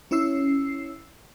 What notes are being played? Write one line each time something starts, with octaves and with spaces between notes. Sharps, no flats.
C#4 E4 C#5 E6 C7